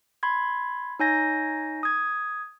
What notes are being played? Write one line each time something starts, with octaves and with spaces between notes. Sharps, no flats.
B5 C6 G#6
D#4 C#5 G#5 G6 A#6
D#6 G#6